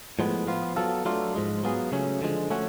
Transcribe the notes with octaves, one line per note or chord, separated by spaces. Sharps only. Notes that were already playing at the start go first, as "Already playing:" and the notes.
A2 F3 G#3 B3
F3 B3 F4
F#3 B3 F4 A4
F#3 A3 D4 F4
G#2 F3 G#3
F#3 B3 F4 G#4
C#3 F#3 A3 C#4
D3 F3 G#3
F3 A3 C#4 F#4